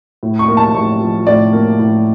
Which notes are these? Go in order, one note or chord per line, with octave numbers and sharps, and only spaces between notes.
A2
C#6
A#3
A5
A2 C#6
F3
A2 D5
A#3
A2